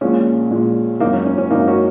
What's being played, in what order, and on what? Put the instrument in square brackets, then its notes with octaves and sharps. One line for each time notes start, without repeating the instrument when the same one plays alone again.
[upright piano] A#1 A#2 G#3 C#4
A#1 A#2 G#3
G#1 F#2 F#3 A#3 D#4
C#4
C#4
C#4
G#1 F#2 F#3 A#3 D#4
C#4 F#4